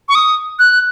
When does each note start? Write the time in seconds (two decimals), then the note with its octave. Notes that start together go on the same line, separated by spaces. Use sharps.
0.09 C#6
0.15 D#6
0.59 F#6